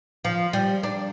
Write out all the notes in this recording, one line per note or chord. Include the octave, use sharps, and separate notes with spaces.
F3
G3
D4